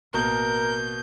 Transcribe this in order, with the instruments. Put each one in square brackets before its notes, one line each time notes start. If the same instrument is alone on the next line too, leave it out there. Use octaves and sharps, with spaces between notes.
[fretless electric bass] A1 [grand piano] B2 A#3 [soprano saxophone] A#4 [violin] G6